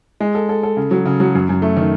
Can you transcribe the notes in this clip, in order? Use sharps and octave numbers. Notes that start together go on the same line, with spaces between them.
G#3
A4
A4
A4
C#3
F#3
C#3
F#3
F#2
F#2
A3
D#3